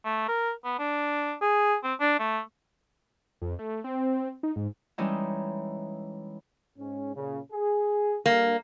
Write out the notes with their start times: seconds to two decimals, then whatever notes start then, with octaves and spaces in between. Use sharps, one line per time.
0.05 A3
0.29 A#4
0.64 B3
0.79 D4
1.42 G#4
1.84 C4
2.00 D4
2.20 A3
3.42 F2
3.59 A3
3.84 C4
4.43 D#4
4.56 G#2
4.98 E3 G3 G#3 C#4 D#4 E4
6.78 G#2 C#4
7.16 A#2 C#3
7.52 G#4
8.26 G3 A#3 D4